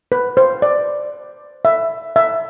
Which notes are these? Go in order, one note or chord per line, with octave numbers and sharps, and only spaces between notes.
B4
C5
D5
E5
E5